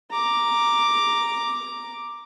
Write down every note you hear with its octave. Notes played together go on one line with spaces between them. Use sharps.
A#5 D6